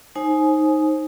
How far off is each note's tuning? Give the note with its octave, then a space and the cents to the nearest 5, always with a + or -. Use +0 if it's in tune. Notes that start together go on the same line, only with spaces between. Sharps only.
D#4 +0 C5 +25 G#5 +20